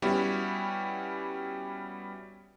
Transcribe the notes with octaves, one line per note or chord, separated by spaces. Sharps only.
G3 B3 C#4 E4 F#4 G4